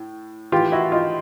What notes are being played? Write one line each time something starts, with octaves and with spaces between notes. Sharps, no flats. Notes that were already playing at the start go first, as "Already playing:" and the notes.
Already playing: A2
A2 E3 F4 G4
E4 F#4
D#4 F4